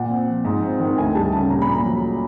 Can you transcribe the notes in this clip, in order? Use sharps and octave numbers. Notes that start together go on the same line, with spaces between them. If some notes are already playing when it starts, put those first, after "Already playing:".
Already playing: A#2 F#5
C4
F3
G#2
C4
D#3
D2 G#5
G3 A5
C#3 A5
A#2 A#5
B5
A#2
A#5
F#3